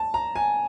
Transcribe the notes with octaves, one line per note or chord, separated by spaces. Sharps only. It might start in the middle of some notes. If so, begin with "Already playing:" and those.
Already playing: A5
A#5
G#5